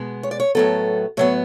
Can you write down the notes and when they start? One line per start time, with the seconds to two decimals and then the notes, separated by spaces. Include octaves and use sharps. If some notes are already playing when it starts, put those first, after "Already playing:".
Already playing: B2 G#3 B3
0.23 C#5
0.31 D5
0.40 C#5
0.55 A2 F#3 B3 A4
1.17 A2 F#3 B3 C#5